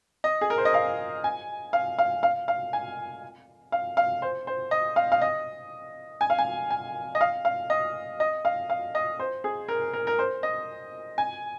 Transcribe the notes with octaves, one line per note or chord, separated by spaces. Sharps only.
D#5
G#4
A#4
C5
D#5
F5
G#5
F5
F5
F5
F5
G#5
F5
F5
C5
C5
D#5
F5
F5
D#5
G#5
F5
G#5
G#5
D#5
F5
F5
D#5
D#5
F5
F5
D#5
C5
G#4
A#4
A#4
A#4
C5
D#5
G#5